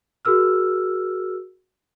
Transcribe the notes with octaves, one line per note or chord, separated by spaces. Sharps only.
F#4 G#4 A#4 E6 F6